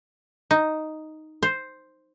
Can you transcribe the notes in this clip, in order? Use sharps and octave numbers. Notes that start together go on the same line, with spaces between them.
D#4
C5